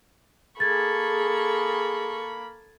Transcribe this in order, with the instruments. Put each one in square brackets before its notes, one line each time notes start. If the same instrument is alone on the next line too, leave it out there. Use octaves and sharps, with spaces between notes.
[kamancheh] A#3 B5 [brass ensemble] G#4 [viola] A4 C#6 [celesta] G#6 A6